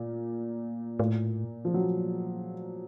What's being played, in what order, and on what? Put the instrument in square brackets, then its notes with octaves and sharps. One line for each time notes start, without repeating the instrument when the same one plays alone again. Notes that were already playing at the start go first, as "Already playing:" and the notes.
Already playing: [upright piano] A#2 A#3
[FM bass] A2
[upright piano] F3
F#3